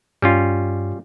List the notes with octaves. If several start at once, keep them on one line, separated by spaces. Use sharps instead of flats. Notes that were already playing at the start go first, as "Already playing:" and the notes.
G2 G3 C#4 F4